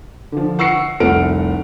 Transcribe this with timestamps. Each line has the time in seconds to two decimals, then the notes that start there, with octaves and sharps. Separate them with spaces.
0.32 D3 F3
0.59 F#5 C#6 E6 C7 C#7
1.00 F1 C2 A3 F#5 F6 D7